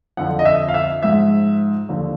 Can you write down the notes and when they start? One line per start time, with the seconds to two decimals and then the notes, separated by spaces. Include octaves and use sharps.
0.17 F2 D3 F3 F#5
0.39 D#5
0.45 E5
0.68 F5
0.74 E5
1.03 G#2 F3 E5
1.89 D#2 D3 F3